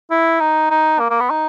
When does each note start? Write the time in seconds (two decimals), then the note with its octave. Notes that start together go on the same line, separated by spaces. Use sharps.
0.11 E4
0.41 D#4
0.71 D#4
1.00 A#3
1.11 A#3
1.20 B3
1.30 D#4